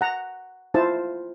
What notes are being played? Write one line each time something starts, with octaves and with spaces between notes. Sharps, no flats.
F#5 A#5
E4 F4 C5 A5